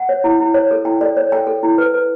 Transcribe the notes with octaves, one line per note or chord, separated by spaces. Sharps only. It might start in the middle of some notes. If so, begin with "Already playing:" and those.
Already playing: F#5
C#5
E4
E4
C#5
A4
E4 G5
A4 D5
A4 C#5
A4 G5
A4
E4
B4
B4